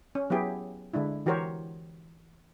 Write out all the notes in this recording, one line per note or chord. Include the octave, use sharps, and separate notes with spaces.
C#4
F#3 B3 E4 G4 G#4
D3 G#3 D4 E4
E3 F#4 G4 A#4 C5 C#5